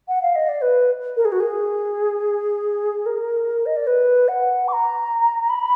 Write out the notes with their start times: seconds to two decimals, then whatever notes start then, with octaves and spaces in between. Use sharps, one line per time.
0.08 F#5
0.22 F5
0.35 D#5
0.48 D5
0.61 B4
1.16 A#4
1.25 G#4
1.32 F#4
1.40 G#4
3.06 A#4
3.66 D#5
3.76 D5
3.87 B4
4.28 F#5
4.68 D6
4.72 A#5
5.49 B5